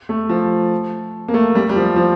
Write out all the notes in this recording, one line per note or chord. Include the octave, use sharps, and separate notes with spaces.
A3
F3
A#3
A3
G3
G3
F3
F3